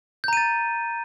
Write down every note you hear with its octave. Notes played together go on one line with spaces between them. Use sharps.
A#5 G6 A6 D#7